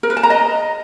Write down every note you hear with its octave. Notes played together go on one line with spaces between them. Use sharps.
A#4
B4
A5
A#5
D#5